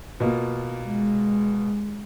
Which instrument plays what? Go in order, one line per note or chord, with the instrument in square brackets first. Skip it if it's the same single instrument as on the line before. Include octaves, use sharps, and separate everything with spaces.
[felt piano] B2 A#3 F4
[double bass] G#3